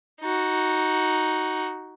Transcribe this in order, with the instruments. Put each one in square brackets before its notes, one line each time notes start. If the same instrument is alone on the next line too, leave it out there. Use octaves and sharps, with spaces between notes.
[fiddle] D#4 F#4